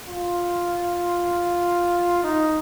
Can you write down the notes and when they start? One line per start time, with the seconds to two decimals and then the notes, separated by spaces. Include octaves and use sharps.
0.09 F4
2.24 D#4